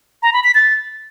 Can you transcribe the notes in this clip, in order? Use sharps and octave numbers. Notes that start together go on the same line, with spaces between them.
A#5
B5
B6
A6